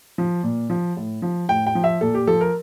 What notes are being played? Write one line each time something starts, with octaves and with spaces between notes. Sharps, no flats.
F3
A#2
F3
A2
F3
A2 G5
G5
F3
E5
A#2 A4
G4
F3 A4
A#4